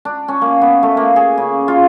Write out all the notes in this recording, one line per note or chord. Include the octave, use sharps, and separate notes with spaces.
D4
C#4
A#3
B3
A3
A#3
G#4
C#3
F4